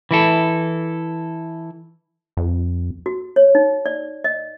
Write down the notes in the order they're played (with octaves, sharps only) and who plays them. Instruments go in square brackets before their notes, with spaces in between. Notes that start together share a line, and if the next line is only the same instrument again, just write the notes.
[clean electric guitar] E3 E4 A4
[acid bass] F2
[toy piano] F#4
C#5
D#4
D5
D#5